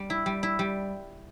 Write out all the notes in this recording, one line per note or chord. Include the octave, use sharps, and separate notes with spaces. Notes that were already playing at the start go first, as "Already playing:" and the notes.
Already playing: G3
E4
G3
E4
G3